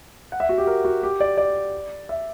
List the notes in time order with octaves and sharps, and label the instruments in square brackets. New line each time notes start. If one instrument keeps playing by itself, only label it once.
[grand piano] F#5
E5
F#4
G4
A#4
F#4
G4
D5
D5
E5